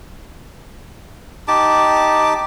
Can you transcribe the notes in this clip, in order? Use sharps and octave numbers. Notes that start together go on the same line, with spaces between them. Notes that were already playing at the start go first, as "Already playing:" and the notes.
D#4 G4 A5 D6